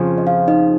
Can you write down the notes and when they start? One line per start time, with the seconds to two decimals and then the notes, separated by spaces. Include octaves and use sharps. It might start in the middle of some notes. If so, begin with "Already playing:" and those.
Already playing: F2 C#3 F3
0.18 D#5
0.27 F4 F5
0.48 D#4 D#5